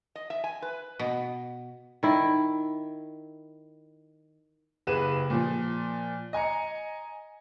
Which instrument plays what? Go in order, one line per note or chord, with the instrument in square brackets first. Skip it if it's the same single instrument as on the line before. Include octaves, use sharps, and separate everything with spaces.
[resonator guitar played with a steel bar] D#5
E5
G#5
B4
[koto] B2
[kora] D#3 E4
[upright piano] F#1 G4 G#4 B4 D#7 E7
A#2 F3
D#5 G#5 A#5 C#7